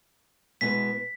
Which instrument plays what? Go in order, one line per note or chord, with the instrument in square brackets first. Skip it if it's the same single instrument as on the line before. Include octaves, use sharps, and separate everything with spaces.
[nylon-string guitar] B2 G#3 B3 E4 B4 [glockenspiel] B6